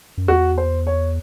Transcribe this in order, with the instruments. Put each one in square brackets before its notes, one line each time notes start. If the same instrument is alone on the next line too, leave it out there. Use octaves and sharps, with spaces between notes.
[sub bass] F#2
[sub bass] E2 [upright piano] F#4
[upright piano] C5
C#5